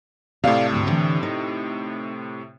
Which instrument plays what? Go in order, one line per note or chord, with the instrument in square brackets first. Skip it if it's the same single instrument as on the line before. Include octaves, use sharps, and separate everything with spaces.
[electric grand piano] A2 C3 [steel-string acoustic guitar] A4 D5 F5
[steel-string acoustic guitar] D2 G#2
D3 E3
D#4